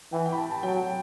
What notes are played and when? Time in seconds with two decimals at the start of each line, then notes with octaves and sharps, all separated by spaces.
0.12 E3 G5
0.26 G5
0.32 B5
0.38 A5
0.51 A5
0.63 F#3 G5